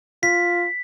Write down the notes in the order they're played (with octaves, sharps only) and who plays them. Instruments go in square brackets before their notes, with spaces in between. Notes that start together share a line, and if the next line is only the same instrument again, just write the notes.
[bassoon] F4 [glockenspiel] B6